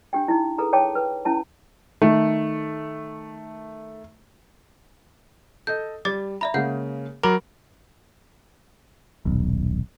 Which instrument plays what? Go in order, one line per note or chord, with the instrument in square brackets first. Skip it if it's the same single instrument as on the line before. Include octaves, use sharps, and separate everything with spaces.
[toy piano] D4 G4 G5
D#4 E4
G#4 A4 B4 A#5
C#5 G5 A5 D6
B4
C#4 E4 A5 A#5
[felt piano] D#3 A3
[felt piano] A4 D#5 [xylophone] G6
[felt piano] G3 [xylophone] D5 D6 A6
[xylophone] D5 E5 B5 [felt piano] A#5
[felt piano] C#3 G#3 A#3 [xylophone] F5 F#5 G6
[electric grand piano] F#3 A#4 [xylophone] B5 D6 F#7
[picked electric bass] D#1 B1